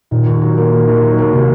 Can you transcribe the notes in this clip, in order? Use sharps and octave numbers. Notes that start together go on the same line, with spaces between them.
A#2 D#3
D#2
F#3
A#3
D#3
D#2
F#3
A#3
C3 D#3